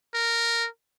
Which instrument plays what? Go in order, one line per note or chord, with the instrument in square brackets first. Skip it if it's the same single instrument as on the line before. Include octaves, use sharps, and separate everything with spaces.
[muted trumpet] A#4